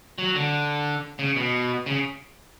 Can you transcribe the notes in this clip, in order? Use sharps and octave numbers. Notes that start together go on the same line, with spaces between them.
F#3
D3
C#3
B2
C#3